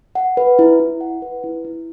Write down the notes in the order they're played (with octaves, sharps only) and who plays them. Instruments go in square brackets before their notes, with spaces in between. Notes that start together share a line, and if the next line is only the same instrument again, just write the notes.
[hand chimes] F#5
B4
E4
E4
F#5
B4
E4
E4